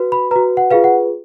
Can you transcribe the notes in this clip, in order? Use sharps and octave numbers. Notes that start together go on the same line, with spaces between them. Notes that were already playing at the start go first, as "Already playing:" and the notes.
Already playing: F#4 B4
B5
F#4 B4 A#5
F#5
F4 G#4 B4 F5
F#5